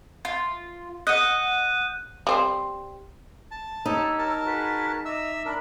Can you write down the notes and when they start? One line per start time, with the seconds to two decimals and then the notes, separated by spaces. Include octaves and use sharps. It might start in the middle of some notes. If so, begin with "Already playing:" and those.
0.25 F4
1.07 D#5 F#5 F#6 G6 D#7
2.27 G3 C4 C5
3.51 A5
3.86 D#4 G4 C#5 E6
4.19 A#4 A5
4.45 F#4 G#4 B4
5.05 D#5 E5 A#5 D6 E6
5.46 D4 A#4 B5